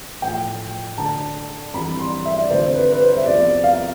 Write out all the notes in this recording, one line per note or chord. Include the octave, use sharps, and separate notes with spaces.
A2 F3 A3 G5
D2 D3 A3 A5
F2 E3 G3 B5
C6
E5
D5
F2 D3 F3 A3 C5
B4
B4
C5
E5
E2 C3 F3 D5
F5